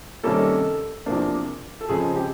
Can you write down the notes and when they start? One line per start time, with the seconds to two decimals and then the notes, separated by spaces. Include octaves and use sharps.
0.24 C3 D#3 G3 A#3 C#4 A4
1.06 E2 C3 F3 A#3 D4
1.81 A4
1.89 C#3 F3 G#3 C4 G#4
2.16 G4